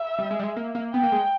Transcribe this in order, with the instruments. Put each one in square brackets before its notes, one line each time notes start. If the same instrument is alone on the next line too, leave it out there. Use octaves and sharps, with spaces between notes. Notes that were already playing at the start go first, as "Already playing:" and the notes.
Already playing: [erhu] E5
[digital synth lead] G3
G#3
G3
G#3
A#3
A#3
[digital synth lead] B3 [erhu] G5
[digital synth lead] A#3
G#3